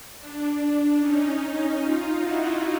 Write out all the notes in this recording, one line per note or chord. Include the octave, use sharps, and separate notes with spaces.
D4
C#4 D#4
C#4 D#4
D#4 F4
E4 F#4